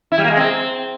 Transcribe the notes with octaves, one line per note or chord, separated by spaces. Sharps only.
E4
G3
A#3
G#3
C4